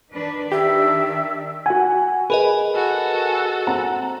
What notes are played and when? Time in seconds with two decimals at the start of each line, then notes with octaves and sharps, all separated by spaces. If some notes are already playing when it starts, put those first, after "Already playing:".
0.11 D#3 D4 B4
0.52 D#3 D4 G4 E5
1.66 F#4 F#5 G#5
2.30 G#4 A#4 B4 D#5
2.75 F#4 A4
3.67 C4 F#5 A#5